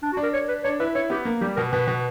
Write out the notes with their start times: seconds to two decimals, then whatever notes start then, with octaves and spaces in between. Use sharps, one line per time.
0.03 D4
0.13 F#4
0.17 D4
0.23 A#4
0.33 C#5
0.49 B4
0.64 D4 C#5
0.80 E4 B4
0.95 E4 C#5
1.10 B3 G4
1.25 A#3
1.41 G3 G4
1.56 B2 A#4
1.72 B2 B4
1.87 B2